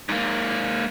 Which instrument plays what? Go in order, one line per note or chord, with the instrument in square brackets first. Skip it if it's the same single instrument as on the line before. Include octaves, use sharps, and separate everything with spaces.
[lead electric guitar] G#2 A#3